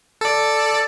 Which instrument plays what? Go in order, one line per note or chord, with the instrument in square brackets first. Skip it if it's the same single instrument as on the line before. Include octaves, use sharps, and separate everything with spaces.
[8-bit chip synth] A4 D5